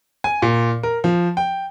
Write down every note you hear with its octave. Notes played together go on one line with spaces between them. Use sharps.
G#5
A#2
A#4
F3
G5